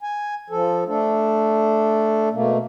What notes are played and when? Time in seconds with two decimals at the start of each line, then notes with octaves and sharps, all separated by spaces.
0.03 G#5
0.50 F3 A4
0.87 A3 D4 A4
2.33 B2 A3 A#3